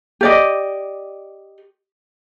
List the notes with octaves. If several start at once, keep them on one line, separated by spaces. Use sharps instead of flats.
G4 D5 D#5